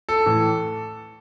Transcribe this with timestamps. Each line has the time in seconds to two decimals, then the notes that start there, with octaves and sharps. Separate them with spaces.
0.09 A4
0.26 A2 E3